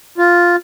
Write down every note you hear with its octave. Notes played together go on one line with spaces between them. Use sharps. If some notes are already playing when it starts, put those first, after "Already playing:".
F4